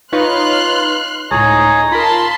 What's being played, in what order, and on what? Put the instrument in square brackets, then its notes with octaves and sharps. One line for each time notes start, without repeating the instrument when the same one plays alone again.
[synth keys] D#4 B4 C#5 [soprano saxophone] F4 [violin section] C6 F6 F#6
[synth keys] C#2 A2 [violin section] D#4 [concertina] G#4 C#5 [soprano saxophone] A#5
[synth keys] F4 A#4 [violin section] A5 C6 [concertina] B5